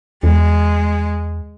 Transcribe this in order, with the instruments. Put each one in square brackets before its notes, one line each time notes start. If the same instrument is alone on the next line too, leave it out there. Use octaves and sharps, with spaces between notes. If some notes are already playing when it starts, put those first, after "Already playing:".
[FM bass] E2 [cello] G#3